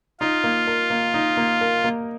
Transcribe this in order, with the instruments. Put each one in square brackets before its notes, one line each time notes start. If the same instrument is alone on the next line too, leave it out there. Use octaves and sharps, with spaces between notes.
[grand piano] D#4 [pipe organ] F4
[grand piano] A#3
A#4
A#3
D#4
A#3
A#4
A#3